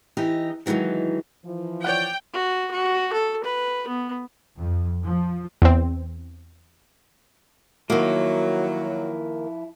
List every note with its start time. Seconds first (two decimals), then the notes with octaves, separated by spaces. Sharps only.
0.17 E3 D#4 G4 D#5
0.66 D#3 E3 F#3 G#3 D#4
1.45 E3 F3
1.84 C#5 D5 F#5 G5
2.34 F#4
2.72 F#4
3.13 A4
3.44 B4
3.88 B3
4.58 F2
5.03 F3
5.62 E2 C4
7.90 D#3 F3 F#3 A#3 E4